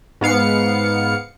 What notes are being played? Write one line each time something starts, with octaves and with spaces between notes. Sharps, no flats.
G#2 B3 F5 C#7